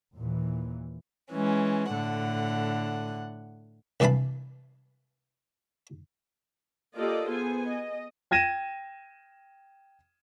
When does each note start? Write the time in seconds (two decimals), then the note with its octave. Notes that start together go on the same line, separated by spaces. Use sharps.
0.14 D#2 A#2 E3
1.32 E3 G#3 C#4
1.92 A2 D3 F#5
4.00 C2 G2 E3 F5 A5 B5
6.96 A#3 F4 G4 A4 D5 D#5
7.31 B3 G#4 C5 G#5
7.67 D#5
8.31 G5 G#6 A#6 D#7 E7